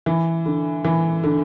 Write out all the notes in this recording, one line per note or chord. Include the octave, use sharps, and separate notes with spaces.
E3
D3
E3
D3